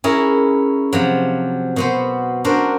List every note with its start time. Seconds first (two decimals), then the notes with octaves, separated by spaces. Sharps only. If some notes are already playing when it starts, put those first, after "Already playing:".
0.04 C#4 E4 G#4 A#4
0.93 C3 F3 F#3
1.76 B2 B3 C5
2.44 C#4 D4 F#4 A#4 C5